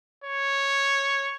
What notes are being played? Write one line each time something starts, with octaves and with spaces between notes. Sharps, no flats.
C#5